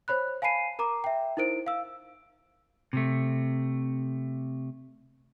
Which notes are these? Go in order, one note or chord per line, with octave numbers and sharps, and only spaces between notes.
C5 C#5 B5 F#6
F5 G#5 A5 B5 C7 D#7
A#4 A#5 D6
E5 G5
D#4 E4 A#4 C5 D7
F5 E6
C3 A3